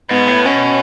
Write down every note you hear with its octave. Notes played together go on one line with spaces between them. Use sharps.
G#2 B3
A2
B2 C#4